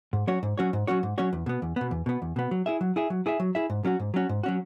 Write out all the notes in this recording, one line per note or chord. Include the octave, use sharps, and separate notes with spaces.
G#2
F#3 C#4 F#4 C#5
G#2
F#3 C#4 F#4 C#5
G#2
F#3 C#4 F#4 C#5
G#2
F#3 C#4 F#4 C#5
E2
B2 B3
E2
B2 B3
E2
B2 B3
E2
B2 B3
F#3
E4 G#4 E5
F#3
E4 G#4 E5
F#3
E4 G#4 E5
F#3
E4 G#4 E5
G#2
F#3 C#4 F#4
G#2
F#3 C#4 F#4
G#2
F#3 C#4 F#4